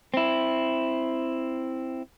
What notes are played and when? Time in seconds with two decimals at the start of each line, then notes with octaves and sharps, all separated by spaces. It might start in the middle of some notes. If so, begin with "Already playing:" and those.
0.14 C4 E4